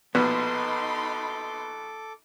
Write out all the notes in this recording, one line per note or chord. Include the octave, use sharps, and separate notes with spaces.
A#1 B2 B3 D#4 A4 B5 C6 D6